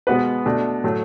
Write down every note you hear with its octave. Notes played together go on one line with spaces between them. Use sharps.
B2 G#3 B3 F#4 B4
B2 A3 D4
A2 F#3 A3